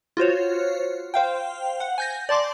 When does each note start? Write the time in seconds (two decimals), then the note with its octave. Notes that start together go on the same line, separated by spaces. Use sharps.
0.17 F4 F#4 C5 C#5
1.14 C5 F5 G5
1.80 F#5
1.98 G#5 G6 A#6
2.29 D5 A5 C6 D6